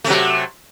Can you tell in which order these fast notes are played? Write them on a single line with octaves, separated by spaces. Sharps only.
A3 C3 F#3